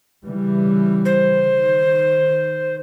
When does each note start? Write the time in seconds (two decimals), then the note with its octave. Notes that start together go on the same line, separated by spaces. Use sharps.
0.26 C#3 E3 G3
1.05 C5
1.44 D#3